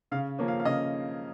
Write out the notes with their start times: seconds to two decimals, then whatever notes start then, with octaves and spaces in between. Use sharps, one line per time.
0.11 C#3 F5
0.39 F3 A#3 C#4
0.48 F5
0.60 F5
0.65 C#3 D#5